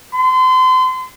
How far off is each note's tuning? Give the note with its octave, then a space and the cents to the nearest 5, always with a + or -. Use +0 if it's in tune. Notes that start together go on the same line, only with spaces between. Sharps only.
C6 -35